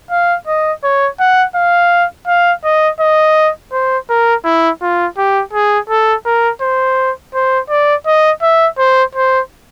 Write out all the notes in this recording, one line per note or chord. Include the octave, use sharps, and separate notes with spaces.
F5
D#5
C#5
F#5
F5
F5
D#5
D#5
C5
A#4
E4
F4
G4
G#4
A4
A#4
C5
C5
D5
D#5
E5
C5
C5